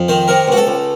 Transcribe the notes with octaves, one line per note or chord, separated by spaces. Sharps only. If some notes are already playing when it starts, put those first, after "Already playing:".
Already playing: F2
D#3 C5
C3 A#4
C#2 F#4
A4
C#2